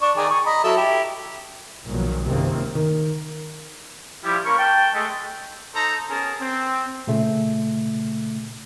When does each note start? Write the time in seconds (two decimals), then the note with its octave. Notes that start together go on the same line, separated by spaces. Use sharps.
0.02 D4 C#6
0.17 D#3 G#4 D5
0.30 G#4 C#6
0.46 D#5 A#5 B5
0.64 F#3 E4 A4
0.77 E4 G4
1.85 B1 A#2 D#3 F3 F#3
2.26 F#1 C#2 C3 D#3 A#3 C4
2.75 D#3
4.24 F3 G3 E4 G4
4.45 A#3 C#4 A#4 B5 C#6
4.59 G5 A5
4.95 G#3 A3
5.75 D#4 A4 C5 A#5
6.10 B3 C#4 G#4 A#4 A5
6.40 C4
7.07 A#2 C#3 A3